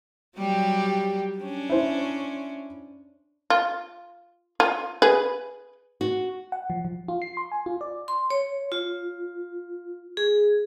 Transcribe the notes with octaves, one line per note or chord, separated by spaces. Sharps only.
F#3 G3 G4
C#4 D4
E4 C5
F4
F4
G#4 B4
F#4
F#5
F3
F3
F4
C7
C6
G#5
F4
D5
C6
C#5
F4
G#4